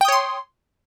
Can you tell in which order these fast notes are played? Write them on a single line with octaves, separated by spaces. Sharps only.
G5 D#6 C#5 C6